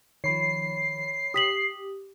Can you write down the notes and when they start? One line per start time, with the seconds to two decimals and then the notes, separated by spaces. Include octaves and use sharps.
0.24 D#3 F3 C#5 B5 C7
1.34 G4 D#6 B6 F#7